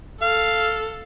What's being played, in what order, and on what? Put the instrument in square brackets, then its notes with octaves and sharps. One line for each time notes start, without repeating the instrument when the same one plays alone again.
[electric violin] A4 [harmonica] F5